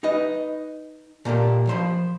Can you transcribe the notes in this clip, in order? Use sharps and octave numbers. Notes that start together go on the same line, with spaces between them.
D#4 B4 D#5
A#2 A#3 G4 A4
F3 C5 B5